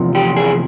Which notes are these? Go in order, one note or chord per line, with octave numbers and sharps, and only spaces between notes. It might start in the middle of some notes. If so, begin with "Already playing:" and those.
Already playing: E2 C3 F3
G4
G#4